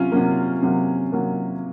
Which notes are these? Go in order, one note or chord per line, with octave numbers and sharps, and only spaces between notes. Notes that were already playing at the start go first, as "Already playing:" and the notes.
Already playing: C3 F#3 C#4 F4
C3 F#3 A#3
C3 F#3 A#3
C3 F#3 A#3